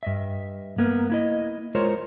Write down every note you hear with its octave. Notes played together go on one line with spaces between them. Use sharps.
G2 D#5 E5
A#3 B3 A#4
A#3 E4 D#5
G#3 F4 A#4 C5 C#5